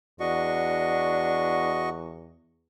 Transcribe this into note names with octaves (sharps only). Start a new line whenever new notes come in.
E2 D4 F#4 D#5 C#6